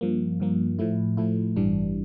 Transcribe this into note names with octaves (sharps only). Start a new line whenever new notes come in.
G2 F3 A#3
G2 F3 A#3
A2 F3 A3 E4
A2 F3 A3 E4
A1 G2 E3 G3 D4